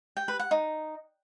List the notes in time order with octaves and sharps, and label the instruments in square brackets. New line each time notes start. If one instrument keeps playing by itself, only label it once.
[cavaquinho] G5
B4
F#5
D#4